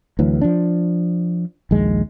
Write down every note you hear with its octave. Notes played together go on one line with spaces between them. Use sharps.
D2 E3 F#3
F3 D4
A#1 D#2 G#3